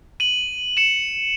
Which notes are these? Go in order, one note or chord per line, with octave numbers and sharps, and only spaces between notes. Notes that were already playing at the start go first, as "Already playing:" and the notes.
D#7 F#7
C#7 E7